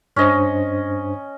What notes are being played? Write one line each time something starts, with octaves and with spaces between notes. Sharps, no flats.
G2 C#4 D4 C5 D#5